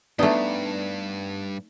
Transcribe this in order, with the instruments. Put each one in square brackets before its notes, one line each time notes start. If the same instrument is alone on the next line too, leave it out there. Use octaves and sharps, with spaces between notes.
[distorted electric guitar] G2 [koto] A3 D#4 [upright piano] B3 D4